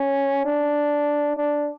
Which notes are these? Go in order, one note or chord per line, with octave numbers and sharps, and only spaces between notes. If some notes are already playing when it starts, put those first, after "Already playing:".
Already playing: C#4
D4
D4